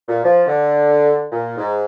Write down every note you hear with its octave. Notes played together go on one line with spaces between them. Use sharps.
A#2
F3
D3
A#2
G#2